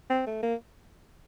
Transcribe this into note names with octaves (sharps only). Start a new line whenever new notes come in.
C4
A3
A#3